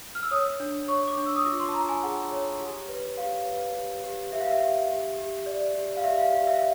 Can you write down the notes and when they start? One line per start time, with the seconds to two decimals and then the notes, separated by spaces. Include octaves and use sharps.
0.15 F6
0.23 E6
0.31 C#5 D#6
0.60 D4
0.88 C#5 C#6
1.08 D6
1.17 D4
1.26 E6
1.36 D#6
1.46 F4 D6
1.60 C6
1.69 A5
1.74 F4 A#5
1.89 G#5
2.03 G#4 F#5
2.32 C#5
2.60 G4
2.88 B4
3.17 G4 F5
3.46 B4
3.75 G4
4.04 G4
4.32 G4 E5
4.41 F5
4.50 E5
4.60 G4
4.89 G4
5.18 G4
5.46 D5
5.75 G4
5.97 F5
6.04 G4 E5
6.18 F5
6.32 G4 F5
6.47 E5
6.54 F5